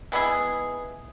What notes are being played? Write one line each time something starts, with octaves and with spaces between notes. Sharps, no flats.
G#3 B3 E4 G#4